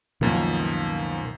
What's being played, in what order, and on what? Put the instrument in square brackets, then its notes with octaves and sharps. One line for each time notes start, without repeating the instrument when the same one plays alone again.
[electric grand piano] C#2 F#2 F3 [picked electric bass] B2 D#3 A#3